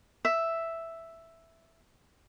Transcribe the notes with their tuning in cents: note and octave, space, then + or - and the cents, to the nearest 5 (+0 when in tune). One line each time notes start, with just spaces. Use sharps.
E5 +0